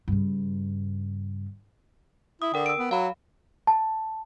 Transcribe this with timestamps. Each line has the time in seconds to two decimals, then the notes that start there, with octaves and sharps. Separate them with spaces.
0.08 G2 C#3
2.42 E4 D#6
2.54 D3 A#4 G5
2.66 E6 D7
2.78 B3
2.91 F#3 F5 B5
3.67 A5